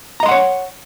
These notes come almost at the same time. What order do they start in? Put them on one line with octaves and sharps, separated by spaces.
A#5 D#5 C6 F#5 C#5